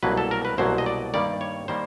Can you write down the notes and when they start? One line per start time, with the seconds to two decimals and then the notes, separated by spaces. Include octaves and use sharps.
0.03 C2 B2 F#3 A#3 B4
0.17 A4
0.31 A#4
0.45 B4
0.58 C2 B2 F#3 A#3 C5
0.78 D#5
0.86 D5
1.14 G2 D#3 G3 A#3 D5
1.41 C#5
1.68 D#3 G3 A#3 C5